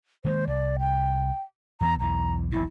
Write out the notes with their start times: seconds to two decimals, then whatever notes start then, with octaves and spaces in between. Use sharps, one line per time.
0.25 D#3 G#3 A#3 C5
0.47 C2 D5
0.79 G5
1.81 E2 E3 B3 A#5
2.00 B1 E2 E3 A#5
2.52 E1 B1 A#2 E4